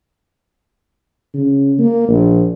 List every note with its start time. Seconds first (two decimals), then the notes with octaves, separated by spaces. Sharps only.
1.34 C#3
1.79 A#3
2.08 A#1